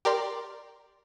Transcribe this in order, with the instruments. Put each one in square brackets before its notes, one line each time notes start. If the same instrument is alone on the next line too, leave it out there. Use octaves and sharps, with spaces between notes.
[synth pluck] G4 A#4 D5 C6